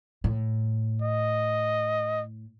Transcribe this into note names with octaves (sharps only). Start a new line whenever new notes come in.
A2
D#5